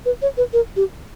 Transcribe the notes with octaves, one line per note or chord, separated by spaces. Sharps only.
B4
C#5
B4
A#4
G4